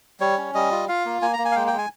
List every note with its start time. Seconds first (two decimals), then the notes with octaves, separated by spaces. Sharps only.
0.20 G3 C#5
0.37 C#4
0.54 G3 D#5
0.71 F4
0.88 F4 F5
1.05 A#3
1.22 A#3 G#5
1.33 A#5
1.39 A#3
1.45 G#5
1.52 F5
1.56 G#3 G5
1.67 G5
1.73 G#3
1.78 G#5